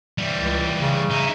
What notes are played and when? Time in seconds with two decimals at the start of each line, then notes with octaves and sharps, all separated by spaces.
0.18 E3 G3
0.38 C#2
0.81 C#3
1.10 D#4 E4